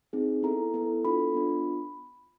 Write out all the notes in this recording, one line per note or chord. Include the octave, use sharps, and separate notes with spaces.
C4 D#4 G#4
B3 E4 A4 A#5
B3 E4 A4
B3 D4 F4 A4 B5
B3 D4 F4